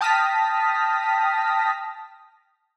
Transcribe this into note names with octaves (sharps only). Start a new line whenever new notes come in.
G5 A5 D#6 F6 A#6 B6